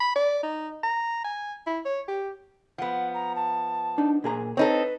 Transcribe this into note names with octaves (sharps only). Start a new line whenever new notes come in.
B5
D5
D#4
A#5
G#5
E4
C#5
G4
F3 B3 F#5
A#5
A5
D4 D#4
A#2 G#4 A#5
C4 D#4 A4 B4 C#5